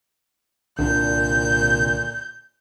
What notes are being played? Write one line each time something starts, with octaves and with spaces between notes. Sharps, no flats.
C2 A#2 D3 D4 G6